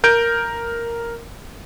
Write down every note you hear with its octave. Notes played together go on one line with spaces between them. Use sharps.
A#4 G6 D7